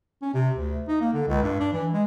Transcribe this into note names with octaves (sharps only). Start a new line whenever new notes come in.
C#4
C3
D2
D#4
A#3
D3
C#2
G2
D4
E3
G#3